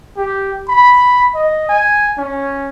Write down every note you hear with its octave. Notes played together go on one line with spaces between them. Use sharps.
G4
B5
D#5
G#5
C#4